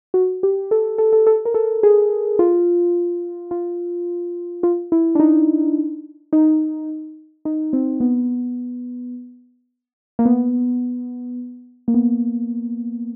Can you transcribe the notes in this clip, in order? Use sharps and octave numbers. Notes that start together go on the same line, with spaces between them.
F#4
G4
A4
A4
A4
A4
A#4
A4
G#4
F4
F4
F4
E4
D4
D#4
D#4
D#4
C4
B3
A#3
B3
A#3
B3